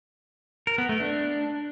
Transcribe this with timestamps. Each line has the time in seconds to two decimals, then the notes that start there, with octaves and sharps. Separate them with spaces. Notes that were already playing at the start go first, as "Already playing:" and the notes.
0.67 A#4
0.78 B3
0.89 A3
1.00 D4